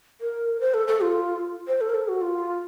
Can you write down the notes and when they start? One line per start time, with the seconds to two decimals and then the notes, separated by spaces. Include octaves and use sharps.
0.21 A#4
0.61 C5
0.74 A4
0.87 A4
1.01 F4
1.68 C5
1.81 A4
1.89 A#4
1.94 A4
2.08 F#4
2.21 F4